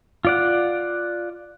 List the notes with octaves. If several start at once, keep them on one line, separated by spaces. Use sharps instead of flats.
F4 D5 F#5